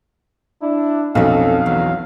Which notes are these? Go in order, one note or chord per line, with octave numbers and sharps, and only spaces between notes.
D4 E4
B1 F2 C4 C#4 A4 F5
A1 E2 F#3